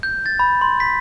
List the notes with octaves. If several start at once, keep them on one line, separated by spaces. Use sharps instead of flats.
G6
A6
B5
C6
B6